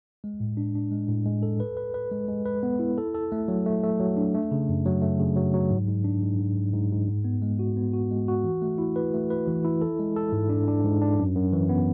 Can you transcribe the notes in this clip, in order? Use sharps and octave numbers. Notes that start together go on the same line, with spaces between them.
G#3
A2
D4
D4
G#3
A2
G#3
A4
B4
B4
B4
G#3
G#3
B4
B3
E4
A4
A4
A3
F#3
A3
A3
F#3
D4
A3
C#3
F#2
F#3
A3
C#3
F#3
F#3
G#2
G#2
D4
G#2
G#2
G#2
G#2
G#2
G#2
B3
G#3
F#4
B3
F#4
G#3
F#4
E3
A3
E4
B4
A3
B4
E3
E4
A4
G#3
A4
G#2
D4
D4
G#2
D4
F#2
F#2
E3
B3